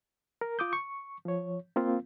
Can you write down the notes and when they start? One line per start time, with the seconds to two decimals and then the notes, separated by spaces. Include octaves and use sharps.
0.41 A#4
0.59 F4 D6 D#6 G6
0.73 C#6
1.25 F3 C#5
1.76 A#3 C4 F4